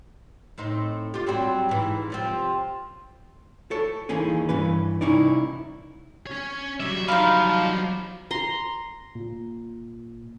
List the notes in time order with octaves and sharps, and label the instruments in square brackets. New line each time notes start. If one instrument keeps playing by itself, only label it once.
[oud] A2 C4 D#4
F4 G4
F#3 G3 C4
G#2 E3
C3 F3 C4
[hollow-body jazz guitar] A4 C#5
D#2 D#3 E3 A#3 C#4 G#4
G2 E3 C#4 B4
C2 C#4 D#4 E4 D5
[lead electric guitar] C#4 C#5
[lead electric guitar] F#3 G3 [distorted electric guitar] E5
[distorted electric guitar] F3 [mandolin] D#4 F5 [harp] B5
[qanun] A#5 C6
[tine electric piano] A#2